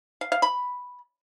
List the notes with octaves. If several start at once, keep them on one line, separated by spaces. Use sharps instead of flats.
F5
F5
B5